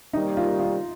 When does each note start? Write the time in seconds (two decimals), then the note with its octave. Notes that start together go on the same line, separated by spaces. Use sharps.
0.13 C3 D#3 G3 A#3 D#4
0.37 F4
0.59 F4